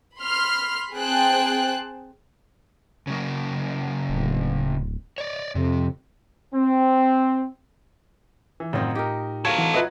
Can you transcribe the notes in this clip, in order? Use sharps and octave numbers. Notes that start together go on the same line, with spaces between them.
B5 C6 F6
C4 G#4 C5 G5 A5 F#6
C#3 F#3 A#3
D1
C#5 D5
F2 C3
C4
E3
G#1 F#2 A2 C4 D#4 F4 D#5
D#4 G4 A#4
F#3 A4 A#4 F5 C#6 G#6
E3 F#5
F4 B4 C#5 D#5 E5 F#6